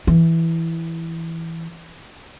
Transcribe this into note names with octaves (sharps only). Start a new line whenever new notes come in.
E3